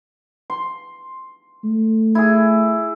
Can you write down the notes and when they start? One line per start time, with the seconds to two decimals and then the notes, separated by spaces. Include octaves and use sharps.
0.50 C6
1.64 A3
2.15 E4 G#4